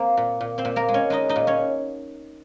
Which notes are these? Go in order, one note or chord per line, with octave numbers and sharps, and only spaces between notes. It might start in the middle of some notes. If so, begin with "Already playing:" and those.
Already playing: A#3 C4 C5
A#2
A#2
C4 C5
A#2
A#3 A#4
G#3
C#4 C#5
G#3 D#4 D#5
D#4 D#5
A#2
C#4 C#5